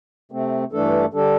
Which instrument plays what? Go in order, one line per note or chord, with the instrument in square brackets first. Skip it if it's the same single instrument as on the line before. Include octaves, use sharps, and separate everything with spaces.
[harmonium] C3 A3 C4
G2 E3 A3 D4 A4
D3 G3 D4 A4